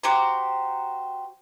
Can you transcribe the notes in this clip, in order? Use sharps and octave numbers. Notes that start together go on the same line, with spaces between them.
F#4 G4 C5 A#5